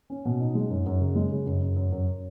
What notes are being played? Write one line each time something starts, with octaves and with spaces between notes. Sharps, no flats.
C#4
B2
D#4
G#3
F#2
F#2
C#3
G#3
C#3
F#2
F#2
F#2
F#2